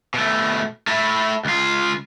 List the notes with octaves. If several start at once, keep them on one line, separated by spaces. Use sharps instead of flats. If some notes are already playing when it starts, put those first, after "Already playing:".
B2 A3
A3 E4
C#2 F4